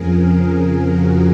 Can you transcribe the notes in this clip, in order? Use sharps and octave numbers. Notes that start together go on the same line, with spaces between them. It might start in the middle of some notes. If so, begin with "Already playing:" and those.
Already playing: F2 C#3 F3 G#4 A#4
A#4
F#4